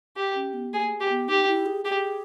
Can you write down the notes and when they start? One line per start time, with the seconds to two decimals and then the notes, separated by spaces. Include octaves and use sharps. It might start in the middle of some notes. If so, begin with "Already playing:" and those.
0.17 G4
0.35 C#4
0.54 B3
0.73 A#3 G#4
1.00 G4
1.10 B3
1.29 D#4 G4
1.47 E4
1.66 G#4
1.85 G4 G#4